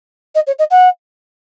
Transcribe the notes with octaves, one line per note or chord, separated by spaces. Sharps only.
D#5
C#5
D#5
F#5